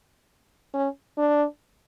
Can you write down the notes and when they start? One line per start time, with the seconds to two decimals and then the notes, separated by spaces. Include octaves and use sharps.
0.74 C#4
1.18 D4